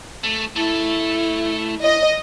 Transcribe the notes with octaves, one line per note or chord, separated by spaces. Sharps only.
A3
A3 E4 A4
D#5